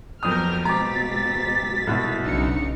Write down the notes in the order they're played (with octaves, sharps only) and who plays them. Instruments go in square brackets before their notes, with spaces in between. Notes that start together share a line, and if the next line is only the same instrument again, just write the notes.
[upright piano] F2 D#6 [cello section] F#3 B3 A#4 [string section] F6 G6
[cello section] B2 G#3 C4 [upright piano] A#5 D6 [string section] A6 B6
[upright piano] C2 B2 E4
[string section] B1 C#7 [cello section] C#3 D4 D#4